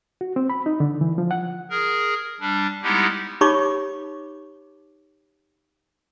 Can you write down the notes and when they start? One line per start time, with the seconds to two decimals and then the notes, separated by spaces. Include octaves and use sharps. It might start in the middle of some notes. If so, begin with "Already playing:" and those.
0.21 F#4
0.36 C4
0.50 B5
0.66 D#4
0.80 D3
1.01 E3
1.18 F3
1.31 F#5
1.70 G#4 A#4
2.40 G3 D4
2.83 G3 G#3 B3 D#4 E4 G4
3.41 D#4 G4 C#5 B5 C#6 D6